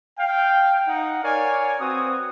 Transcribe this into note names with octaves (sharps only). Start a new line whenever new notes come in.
F5 G5
D#4 F#5
A#4 C#5 D5 F5 G#5
C4 F#4 B4 D#6